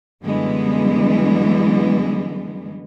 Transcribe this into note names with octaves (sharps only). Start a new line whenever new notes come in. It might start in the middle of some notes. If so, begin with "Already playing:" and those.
F#2 D3 E3 G3 G#3 B3